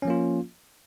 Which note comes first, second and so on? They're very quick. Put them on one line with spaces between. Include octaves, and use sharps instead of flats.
C#4 F3 A#3 F4